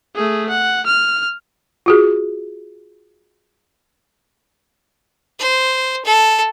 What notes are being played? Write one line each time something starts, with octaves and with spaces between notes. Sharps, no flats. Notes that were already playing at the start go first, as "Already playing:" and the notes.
A3 G#4
F#5
F6
F4 F#4 G#4
C5
A4